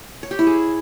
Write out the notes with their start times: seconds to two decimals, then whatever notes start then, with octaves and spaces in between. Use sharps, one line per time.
0.23 C#5
0.31 G4
0.39 E4
0.47 G#4